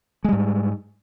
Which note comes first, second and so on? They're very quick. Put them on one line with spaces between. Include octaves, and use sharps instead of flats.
G#3 G3 G#2